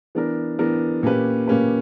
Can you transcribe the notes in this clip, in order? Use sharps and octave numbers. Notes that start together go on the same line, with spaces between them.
E3 B3 D4 A#4
E3 B3 D4 A#4
A#2 A#3 C#4 G4 B4
A#2 A#3 C#4 G4 B4